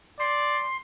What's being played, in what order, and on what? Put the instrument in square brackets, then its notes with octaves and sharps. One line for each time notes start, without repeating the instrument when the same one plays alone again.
[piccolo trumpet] D5 [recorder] C6